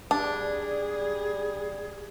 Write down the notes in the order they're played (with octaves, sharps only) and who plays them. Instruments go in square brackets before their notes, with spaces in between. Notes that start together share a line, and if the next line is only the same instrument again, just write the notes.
[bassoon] G3 [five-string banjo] D4 [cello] G#4